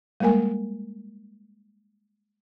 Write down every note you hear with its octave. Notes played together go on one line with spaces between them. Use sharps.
G3 G#3 A#3 A#4 G#5